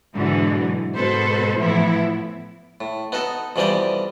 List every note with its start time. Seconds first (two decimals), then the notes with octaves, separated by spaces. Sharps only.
0.15 G#2 B2 D3 E3 F#3
0.96 G#2 B2 F#4 A4 B4 C5
1.57 A2 E3 F3 B3 E4
2.81 A2
3.12 B3 D#4 F#4 A4
3.56 F2 B2 E3 G3 G4 D5